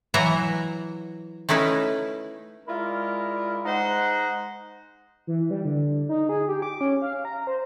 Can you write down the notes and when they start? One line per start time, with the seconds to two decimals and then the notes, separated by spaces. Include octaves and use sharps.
0.14 E3 F#3 E4 F#4 E5 A#5
1.49 A3 C#4 D#4 E4 B4
2.68 G#3 E4 F4 A#4 D5
3.65 G#3 D#4 C5 F#5
5.27 E3
5.51 G3
5.65 D3
6.09 D#4
6.29 G#4
6.48 G4
6.62 D6
6.81 C#4
7.02 F5
7.25 A#5
7.47 C5